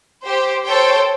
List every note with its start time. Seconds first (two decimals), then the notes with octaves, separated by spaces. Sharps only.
0.24 G4 C5
0.65 A4 C5 C#5 G5